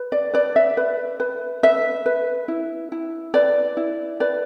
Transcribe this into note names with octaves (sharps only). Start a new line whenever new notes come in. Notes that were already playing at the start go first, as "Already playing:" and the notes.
Already playing: B4
D5
B4 D5
E5
B4
B4
B4 E5
B4
E4
E4
B4 D5
E4
B4 D5